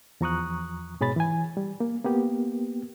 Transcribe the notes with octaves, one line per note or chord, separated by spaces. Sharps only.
E2 F3 A#5 C#6 D#6 F#6
G#2 B2 G#4 C#5 B5 A6
E3 G#5
G3
A#3
A#3 B3 G4